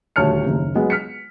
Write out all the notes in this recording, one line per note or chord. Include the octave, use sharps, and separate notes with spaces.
D#1 D2 C#5 A5 F6 C#7
F#1 D#2
F#3 G#3 B3
F6 B6 C#7